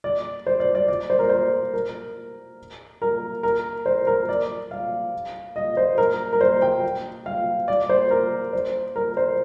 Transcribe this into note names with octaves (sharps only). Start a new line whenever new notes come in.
D5
C5
D5
D5
D5
C5
A#4
C5
A#4
A#4
A#4
C5
A#4
D5
F5
D#5
C5
A#4
A#4
C5
G5
F5
D5
C5
A#4
C5
A#4
C5